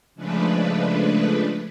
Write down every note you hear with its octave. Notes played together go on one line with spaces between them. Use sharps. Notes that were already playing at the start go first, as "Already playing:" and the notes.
C#3 F3 G#3 A3 D4 B4